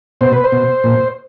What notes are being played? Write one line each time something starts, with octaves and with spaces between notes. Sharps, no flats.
B2 C5
B4
C5
B2
A#2